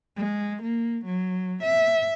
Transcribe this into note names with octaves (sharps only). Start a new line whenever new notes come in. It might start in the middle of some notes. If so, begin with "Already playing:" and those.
G#3
A#3
F#3
E5